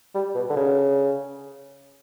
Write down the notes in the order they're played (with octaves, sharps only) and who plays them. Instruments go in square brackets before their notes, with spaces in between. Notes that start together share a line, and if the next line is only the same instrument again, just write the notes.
[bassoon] G3
B2
D3
C#3